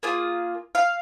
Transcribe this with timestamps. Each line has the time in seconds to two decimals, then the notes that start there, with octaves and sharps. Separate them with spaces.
0.03 A#3 F4 G#4
0.75 F5